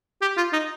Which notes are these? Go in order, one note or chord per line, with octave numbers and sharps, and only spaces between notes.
G4
F4
D#4